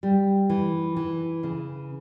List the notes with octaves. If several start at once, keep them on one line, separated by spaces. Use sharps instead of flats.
G3
E3
E3
C#3